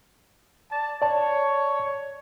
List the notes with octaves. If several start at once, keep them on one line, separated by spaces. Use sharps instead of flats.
D5 A5
C#5 D5 A5